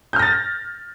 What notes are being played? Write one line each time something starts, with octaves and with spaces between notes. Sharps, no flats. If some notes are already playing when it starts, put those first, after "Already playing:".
F6 G6 A6 A#6